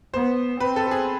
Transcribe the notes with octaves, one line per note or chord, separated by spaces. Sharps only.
B3 C5
C4 B4
A4
A4
G#4